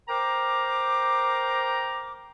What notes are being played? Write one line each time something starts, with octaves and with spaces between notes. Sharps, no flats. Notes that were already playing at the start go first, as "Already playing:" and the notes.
A#4 C5 G5 A#5 D6